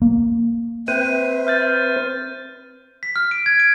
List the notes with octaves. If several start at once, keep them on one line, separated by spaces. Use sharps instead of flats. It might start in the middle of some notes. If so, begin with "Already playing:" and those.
A#3
C4 B4 C5 E5 D#7
F6 G6 A6
F6
B6
F6
D7
G#6
D7